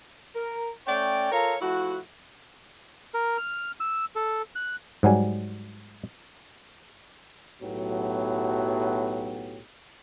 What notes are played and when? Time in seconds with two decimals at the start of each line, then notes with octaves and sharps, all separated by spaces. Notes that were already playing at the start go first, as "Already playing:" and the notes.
0.36 A#4
0.87 A3 C#4 C#5 D5 G5
1.32 F4 A4 A#4 C#5 F5 A#5
1.61 F3 A3 E4 F#4
3.14 A#4
3.38 F6
3.80 E6
4.16 A4
4.55 F#6
5.03 G#2 F#3 G3 G#5
7.61 B1 A2 F#3 B3 G4